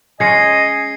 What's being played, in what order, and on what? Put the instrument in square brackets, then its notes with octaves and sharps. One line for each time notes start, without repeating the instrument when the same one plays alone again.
[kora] G#3 C#4 [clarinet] D#5 [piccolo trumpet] G#5 [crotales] G#6 C7 C#7